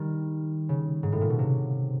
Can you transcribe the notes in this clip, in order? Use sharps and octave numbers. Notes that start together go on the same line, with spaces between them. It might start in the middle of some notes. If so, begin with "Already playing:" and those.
Already playing: D#3 G3
C#3
G#2
A2
A#2
B2
C3